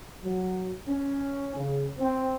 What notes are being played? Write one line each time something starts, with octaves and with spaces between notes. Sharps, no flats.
F#3
C#4
C#3
C4